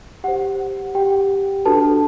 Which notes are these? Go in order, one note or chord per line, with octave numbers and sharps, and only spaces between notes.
G4 C5 F#5
G4 G5
D4 F#4 A4 B4 A5